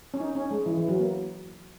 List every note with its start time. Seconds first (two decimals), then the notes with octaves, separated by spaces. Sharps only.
0.14 C#4
0.20 D#4
0.35 C#4
0.51 G#3
0.66 E3
0.77 E3
0.89 F#3
0.99 A#3